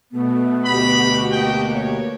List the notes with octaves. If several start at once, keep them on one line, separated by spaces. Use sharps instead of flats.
B2 A3 B3
D2 B2 F#4 G4 B5
A#3 D#5 G5
C#5